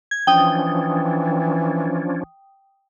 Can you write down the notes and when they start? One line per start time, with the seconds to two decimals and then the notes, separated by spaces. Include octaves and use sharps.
0.11 G#6
0.27 E3 F3 C#4 D4 G5 D#6